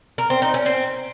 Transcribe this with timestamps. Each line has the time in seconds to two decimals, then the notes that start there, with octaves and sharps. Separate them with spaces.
0.18 A#4
0.30 C4
0.42 D#4
0.54 C#4
0.66 C4